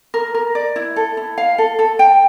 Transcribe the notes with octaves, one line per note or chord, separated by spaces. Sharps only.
A#4
A#4
D5
E4
A4
E4
F5
A4
A4
G5